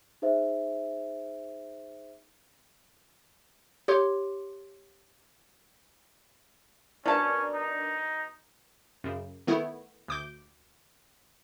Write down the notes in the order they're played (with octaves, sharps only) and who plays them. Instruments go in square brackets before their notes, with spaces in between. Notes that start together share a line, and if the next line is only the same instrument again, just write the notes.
[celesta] D#4 G#4 C5 E5
[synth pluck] G4 C#5 C6 D6
[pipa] B2 A5 [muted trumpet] C#4 [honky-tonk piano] D4 A#4
[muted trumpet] D#4
[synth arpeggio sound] F#2 C#3
D#3 A3 B3 E4
D2 D6 G6